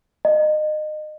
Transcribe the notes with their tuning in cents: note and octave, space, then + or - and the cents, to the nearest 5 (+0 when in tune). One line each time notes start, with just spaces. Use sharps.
D#5 -25